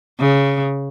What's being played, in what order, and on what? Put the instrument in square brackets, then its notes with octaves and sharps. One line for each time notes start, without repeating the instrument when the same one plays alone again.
[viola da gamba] C#3